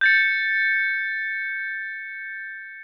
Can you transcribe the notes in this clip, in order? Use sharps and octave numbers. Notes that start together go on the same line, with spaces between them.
G6 A6 C#7